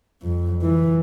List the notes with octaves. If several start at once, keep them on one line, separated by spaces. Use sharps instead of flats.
F2
E3